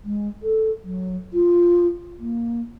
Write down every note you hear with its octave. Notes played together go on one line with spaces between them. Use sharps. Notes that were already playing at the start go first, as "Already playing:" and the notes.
G#3
A4
F#3
F4
A#3